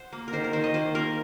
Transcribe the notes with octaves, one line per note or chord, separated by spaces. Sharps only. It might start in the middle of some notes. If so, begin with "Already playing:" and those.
Already playing: C5 F#5
A#3
A#4
D#3 C5
A#4
D#3 C5
D#5
A#3 C5
A#3 A#4